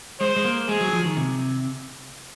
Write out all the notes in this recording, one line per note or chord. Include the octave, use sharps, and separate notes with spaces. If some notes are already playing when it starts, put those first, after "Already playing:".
G#3 C5
G#3
A#3
G#3 G#4
F#3
D#3
F3
D#3
C3